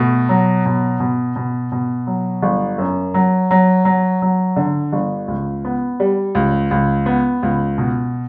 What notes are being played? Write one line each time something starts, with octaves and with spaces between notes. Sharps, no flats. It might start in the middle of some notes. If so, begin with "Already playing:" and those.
Already playing: B2 A3
F#3
B2
B2
B2
B2
F#3
G1
F#2
F#3
F#3
F#3
F#3
D3
G1
C#2
B3
G3
C#2
C#2
B3
C#2
B2